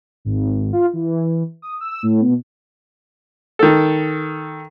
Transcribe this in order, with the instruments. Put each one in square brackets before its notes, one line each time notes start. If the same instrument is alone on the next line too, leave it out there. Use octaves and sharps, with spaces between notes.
[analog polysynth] G#1
F4
E3
D#6
E6
A2
B2
[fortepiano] D#3 A4